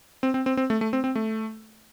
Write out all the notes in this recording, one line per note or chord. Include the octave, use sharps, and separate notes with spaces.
C4
C4
C4
C4
A3
A3
C4
C4
A3